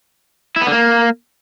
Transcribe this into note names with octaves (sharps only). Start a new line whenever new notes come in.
E4
B3
D3
A#3